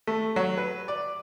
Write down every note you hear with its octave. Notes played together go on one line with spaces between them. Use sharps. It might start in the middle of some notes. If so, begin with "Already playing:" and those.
A3
F#3
B4
D5